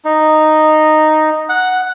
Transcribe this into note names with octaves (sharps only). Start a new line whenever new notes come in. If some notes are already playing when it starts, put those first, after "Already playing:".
D#4
F#5